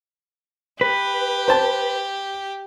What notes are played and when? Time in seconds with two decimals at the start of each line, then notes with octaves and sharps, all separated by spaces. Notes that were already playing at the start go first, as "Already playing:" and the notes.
0.81 G4 B4
1.48 C5 A5